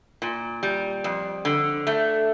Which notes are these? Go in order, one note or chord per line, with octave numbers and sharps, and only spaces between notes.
A#2
G3
F2
D3
A3